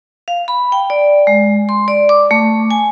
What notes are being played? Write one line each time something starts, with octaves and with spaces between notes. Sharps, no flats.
F5
B5
G5
D5
G#3
C6
D5
D6
A3
G#5